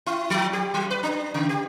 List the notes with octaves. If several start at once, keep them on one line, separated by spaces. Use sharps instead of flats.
E4
F3
G4
F#3
B4
D4
C#3
G4